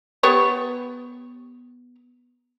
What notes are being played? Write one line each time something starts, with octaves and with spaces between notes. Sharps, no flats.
B3 G4 C#5